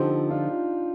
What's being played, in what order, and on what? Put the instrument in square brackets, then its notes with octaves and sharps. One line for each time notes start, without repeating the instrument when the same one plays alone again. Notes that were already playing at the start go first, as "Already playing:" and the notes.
Already playing: [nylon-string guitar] D3 F3 C4 [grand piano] D#4 G4
[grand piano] D4 F4